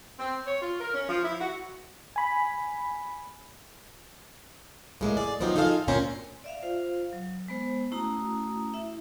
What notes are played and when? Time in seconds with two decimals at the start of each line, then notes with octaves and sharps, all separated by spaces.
0.19 C4
0.45 C#5
0.61 F4
0.80 A#4
0.93 C#4
1.09 F3
1.24 E4
1.40 F#4
2.16 G#5 B5
5.01 A2 G#3 A#3
5.17 G#4 D5
5.41 F3 F#3 B3 C4 D#4
5.56 D#4 F4 G#4 A4 C5 F5
5.88 D2 A#2 C4 C#4 C5 A#5
6.44 D5 E5 F5
6.62 F4 C5 F5
7.13 F#3
7.48 G#3 B3 C5
7.91 A3 C#4 E4 F#4 A#5 D#6
8.74 E4 E5